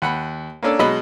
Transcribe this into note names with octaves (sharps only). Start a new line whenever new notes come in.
D#2 F#5 B5
A#3 C#4 D4 A4
B2 F#3 G#3 D#5 B5